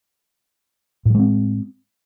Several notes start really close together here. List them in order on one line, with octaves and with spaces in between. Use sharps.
A2 G3 G#3 C4